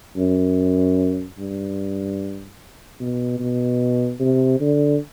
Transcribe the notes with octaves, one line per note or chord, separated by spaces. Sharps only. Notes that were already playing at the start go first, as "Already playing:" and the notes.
F#2
G2
B2
B2
C3
D3